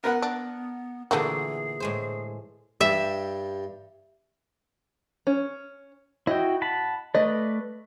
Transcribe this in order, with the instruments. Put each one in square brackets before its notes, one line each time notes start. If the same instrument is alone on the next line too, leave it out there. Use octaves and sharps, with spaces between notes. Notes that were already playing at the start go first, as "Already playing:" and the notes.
[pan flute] B3 [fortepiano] A#4 B4 F#5
[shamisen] D4
[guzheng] A#2 D3 E3 [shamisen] A3 A#3 F#4 [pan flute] G#4
[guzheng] A2 G#3 C5
[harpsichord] G2 G3 [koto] E5
[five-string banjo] C#4
[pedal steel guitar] E4 F#4 G5 [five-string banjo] D#5
[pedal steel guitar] F#5 A5 B5
[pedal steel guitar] A3 B4 D5 [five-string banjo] D#5